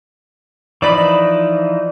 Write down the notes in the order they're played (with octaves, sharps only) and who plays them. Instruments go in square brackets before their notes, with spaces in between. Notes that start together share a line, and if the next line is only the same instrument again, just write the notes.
[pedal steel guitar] E3 F3 D#4 [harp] D5 B5